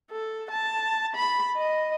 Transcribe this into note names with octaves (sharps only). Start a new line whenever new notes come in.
A4
A5
B5
D#5